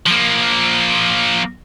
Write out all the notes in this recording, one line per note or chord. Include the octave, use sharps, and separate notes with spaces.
F3 A#3